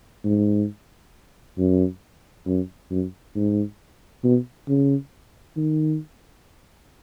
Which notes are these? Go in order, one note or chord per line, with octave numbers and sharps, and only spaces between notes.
G#2
F#2
F#2
F#2
G#2
B2
C#3
D#3